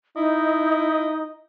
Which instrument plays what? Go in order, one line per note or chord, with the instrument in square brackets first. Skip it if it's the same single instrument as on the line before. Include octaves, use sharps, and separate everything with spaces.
[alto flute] D#4 [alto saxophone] E4 [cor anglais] D#5